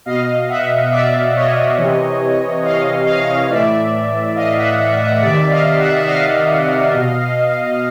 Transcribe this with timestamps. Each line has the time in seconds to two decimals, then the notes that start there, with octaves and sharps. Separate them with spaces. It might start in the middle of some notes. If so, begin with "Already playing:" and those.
0.06 B2 D#5 F5
0.49 E5 F#5
0.91 D5 E5
1.35 C#5 D#5
1.78 C3 E3
2.64 D#5 F5
3.06 D#5 F5
3.50 A2 E3 D5 E5
4.35 D#5 F5
4.57 E5 F#5
4.78 E5 F#5
5.00 E5 F#5
5.21 C3 D#3 D5 E5
5.51 D#5 F5
5.79 E5 F#5
5.98 E5
6.07 D#5 F5
6.93 B2